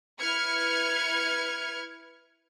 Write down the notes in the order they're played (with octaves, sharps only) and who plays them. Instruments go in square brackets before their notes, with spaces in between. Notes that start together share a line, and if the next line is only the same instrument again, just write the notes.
[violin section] E4 B4 F6 G#6 C#7